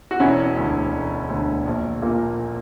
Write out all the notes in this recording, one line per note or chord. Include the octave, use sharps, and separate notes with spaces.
F#4
E1 C#4 E4
D2 D3
E1
D2 D3
A#1
A#2 A#3